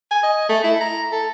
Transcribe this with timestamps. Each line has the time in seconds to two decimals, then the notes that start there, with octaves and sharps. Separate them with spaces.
0.11 G#5
0.23 D#5
0.49 A3
0.64 E4
0.81 A#5
1.12 A4